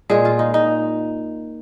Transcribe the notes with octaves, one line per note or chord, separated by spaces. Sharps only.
A#2 G#3 G#4
F4
D#4
D#4